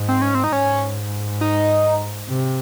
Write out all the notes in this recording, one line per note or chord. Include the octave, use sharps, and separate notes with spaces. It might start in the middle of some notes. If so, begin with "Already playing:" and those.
Already playing: G#2
C4
C#4
C4
D#4
G#2 C#4
D#4
C3